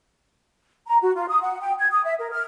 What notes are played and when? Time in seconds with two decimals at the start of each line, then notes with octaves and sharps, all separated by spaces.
0.87 A#5
1.02 F#4
1.15 F4
1.29 D#6
1.42 F#5
1.61 G5
1.79 G#6
1.91 D#6
2.05 E5
2.19 A#4
2.31 F6